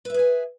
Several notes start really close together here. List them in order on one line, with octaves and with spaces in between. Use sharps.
B4 E5 G#4 G#5